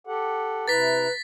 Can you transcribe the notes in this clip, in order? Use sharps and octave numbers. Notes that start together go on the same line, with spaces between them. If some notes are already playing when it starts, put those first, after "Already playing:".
G4 A4 F#5
C3 E4 B4 A#5 A6 B6